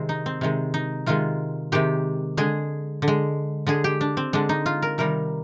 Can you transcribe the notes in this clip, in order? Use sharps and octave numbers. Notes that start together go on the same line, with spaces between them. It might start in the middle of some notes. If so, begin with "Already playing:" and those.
Already playing: C3 D#3 G#3 C4
D#4
C4
C3 D#3 G#3
D#4
C3 D#3 G#3 F4
C3 D#3 G#3 G4
D3 G#3 G#4
D3
G#3
D3 G#3 G#4
G4
D4
C4
D3 G#3 D4
D#4
F4
A#4
C3 D#3 G3 A#4